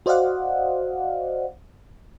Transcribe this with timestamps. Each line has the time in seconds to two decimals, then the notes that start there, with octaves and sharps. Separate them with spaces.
0.06 F#4 C5 D5 D#5 F5 F#5